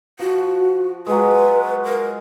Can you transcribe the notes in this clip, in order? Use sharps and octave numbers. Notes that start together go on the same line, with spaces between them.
F3 F#4
F#3 G#3 B4
A#4